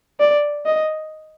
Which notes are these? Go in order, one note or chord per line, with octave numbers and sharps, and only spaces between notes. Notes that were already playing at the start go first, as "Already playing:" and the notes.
D5
D#5